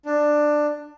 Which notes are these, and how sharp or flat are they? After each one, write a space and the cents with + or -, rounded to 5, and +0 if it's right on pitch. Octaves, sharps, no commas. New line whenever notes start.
D4 +15